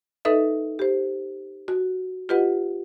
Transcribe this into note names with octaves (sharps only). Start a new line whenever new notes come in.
D#4 A4 B4 D#5 E5
G4 C5
F#4
F4 G4 B4 D#5 F#5